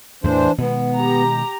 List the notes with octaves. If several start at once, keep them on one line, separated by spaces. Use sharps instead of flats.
E2 A2 E3 D4 C5
B2 D#3 G#3 B3
G4 A#5